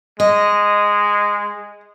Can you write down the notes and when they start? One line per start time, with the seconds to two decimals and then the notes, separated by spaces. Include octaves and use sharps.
0.20 G#3 D#5